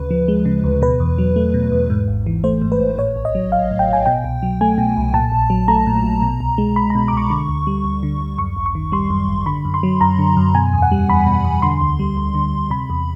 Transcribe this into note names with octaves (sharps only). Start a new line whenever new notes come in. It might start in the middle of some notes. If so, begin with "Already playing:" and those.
Already playing: D2 C#3 B4
F3
G#3
C#3
D2
B2 B4
E2
F#3
A3
B2
E2
G#2
G#1
E3
A3 C5
G#2
B4
G#1
A2 C#5
A#1
D#5
F#3
A#1 F5
A2
G5
A#1 G#5
B2 G5
C2
F#3
A3 G#5
B2
C2
A#2 A5
A#1
F#3
A3 A#5
A#2
A#1
B2
C2
G#3
C2 B5
A#5
B2
D6
C2 C#6
D3
D2
G3
D2
D3
D2
F#2 C#6
G#1
C#6
D#3
G3 C6
F#2
G#1
D3 B5
F#2
C6
F#3
F#2 A#5
D3
F#2
B2 G#5
E2
F#5
G3
E2 B5
B2
E2
D3 C6
D2
G3
D2
D3
D2
C3 B5
E2